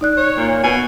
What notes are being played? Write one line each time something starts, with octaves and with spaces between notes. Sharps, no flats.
D#4 D5 F#6
C#5
A#2
B2 G#5